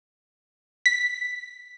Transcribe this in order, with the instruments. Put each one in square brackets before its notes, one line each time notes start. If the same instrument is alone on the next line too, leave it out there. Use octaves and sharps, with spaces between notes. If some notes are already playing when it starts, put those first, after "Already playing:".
[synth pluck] B6